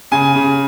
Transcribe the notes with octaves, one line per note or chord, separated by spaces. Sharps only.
C#3 G#5
C#3